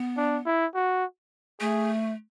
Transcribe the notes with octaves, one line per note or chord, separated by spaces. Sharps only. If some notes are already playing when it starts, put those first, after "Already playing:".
Already playing: B3
D4
E4
F#4
A3 G#4